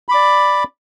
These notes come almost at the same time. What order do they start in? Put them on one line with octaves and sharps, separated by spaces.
B5 D6 D5